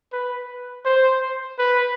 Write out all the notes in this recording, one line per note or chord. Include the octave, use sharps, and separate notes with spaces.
B4
C5
B4